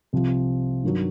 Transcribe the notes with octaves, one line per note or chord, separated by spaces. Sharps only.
C2 C3 F3
G2 D#3 F#3